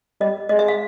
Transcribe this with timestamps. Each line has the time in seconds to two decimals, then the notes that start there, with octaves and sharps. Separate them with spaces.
0.20 G3 D#5
0.49 G#3 D#5
0.59 E5
0.68 F5